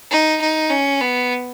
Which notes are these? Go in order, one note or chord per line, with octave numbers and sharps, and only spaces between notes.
D#4
D#4
C#4
B3